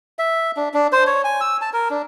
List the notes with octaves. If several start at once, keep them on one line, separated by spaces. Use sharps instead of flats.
E5
D4
D4
C5
C#5
G#5
E6
A5
A#4
D4